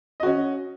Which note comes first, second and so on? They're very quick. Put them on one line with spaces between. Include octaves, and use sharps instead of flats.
D#5 F#4 C#4